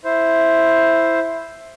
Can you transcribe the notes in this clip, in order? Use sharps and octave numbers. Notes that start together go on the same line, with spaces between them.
E4 C5